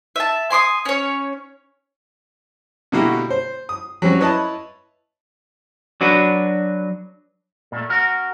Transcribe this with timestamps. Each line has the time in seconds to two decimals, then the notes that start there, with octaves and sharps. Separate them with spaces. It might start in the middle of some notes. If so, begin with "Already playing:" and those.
0.16 E5 A5
0.50 G#5 C6 D6 D#6
0.85 C#4 C#5
2.92 B2 D3 A#3 E4 F#4 G4
3.30 C5
3.69 D#6
4.02 F#3 G3 C4 C#4
4.20 E4 B4 C#5 D#5 A5
6.01 F#3 D4 F#4 B4
7.72 A#2 A3
7.90 F#4 A#4